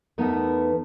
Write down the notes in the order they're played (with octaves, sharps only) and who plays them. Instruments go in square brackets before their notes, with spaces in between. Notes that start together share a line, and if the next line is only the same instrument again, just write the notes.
[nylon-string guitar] E2 A3 B3 D#4 A#4